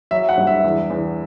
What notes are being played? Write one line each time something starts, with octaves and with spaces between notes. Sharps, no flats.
F#3 E5
F#5
G2
E5
E2
E2